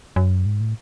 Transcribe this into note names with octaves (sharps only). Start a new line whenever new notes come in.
F#2
G#2
A2